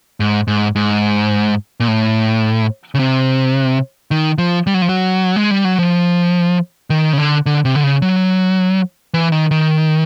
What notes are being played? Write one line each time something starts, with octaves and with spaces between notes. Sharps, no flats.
G#2
G#2
G#2
A#2
A2
C#3
C3
D#3
F3
G3
F#3
F3
F#3
G#3
G3
F#3
F3
D#3
C#3
D3
D3
C3
D3
C#3
F#3
E3
D#3
D#3